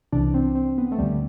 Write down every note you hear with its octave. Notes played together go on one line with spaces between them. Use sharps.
C2 C3 E3 D4
C4
C4
B3
A3
D2 D3 G3